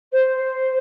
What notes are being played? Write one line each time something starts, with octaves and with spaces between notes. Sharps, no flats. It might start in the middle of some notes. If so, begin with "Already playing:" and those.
C5